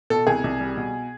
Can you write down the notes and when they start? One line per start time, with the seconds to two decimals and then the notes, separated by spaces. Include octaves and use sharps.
0.10 B2 A4
0.27 C2 G#4
0.44 C2
0.60 G3
0.77 B2